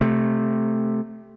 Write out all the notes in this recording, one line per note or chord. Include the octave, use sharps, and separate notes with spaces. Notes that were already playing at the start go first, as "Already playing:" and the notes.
C3 A3